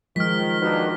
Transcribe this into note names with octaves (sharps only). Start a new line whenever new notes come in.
D#3 F3 G#3 F6 B6
D#2 D#3 D4 D#4 F#4 B4